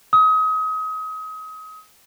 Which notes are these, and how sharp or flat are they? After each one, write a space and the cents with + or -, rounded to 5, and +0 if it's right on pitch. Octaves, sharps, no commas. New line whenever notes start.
D#6 +30